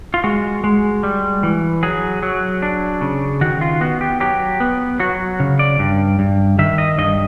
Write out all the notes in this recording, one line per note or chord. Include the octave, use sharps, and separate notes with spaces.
F4
G#3 F#4
G#3
G3
E3
F#3 G#4
F#3
D4
C#3
D#3 F#4
F4
B3 F#4
G4
F#3 G4
B3
F#3 F#4
C#3
D5
G2
G2
D#3 E5
D#5
G2 D#5